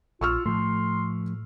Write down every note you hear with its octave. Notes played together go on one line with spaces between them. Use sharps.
A#1 F4 C#6 E6 F6
A2 F3 A3 C6